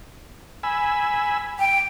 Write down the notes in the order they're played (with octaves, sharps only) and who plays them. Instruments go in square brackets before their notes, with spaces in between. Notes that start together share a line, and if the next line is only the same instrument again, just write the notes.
[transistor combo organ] G#5 B5 E6
[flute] G5